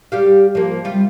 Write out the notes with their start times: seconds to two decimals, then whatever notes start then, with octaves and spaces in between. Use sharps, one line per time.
0.12 G3 G4 F5
0.55 F3 A#3
0.84 C3 G3 F4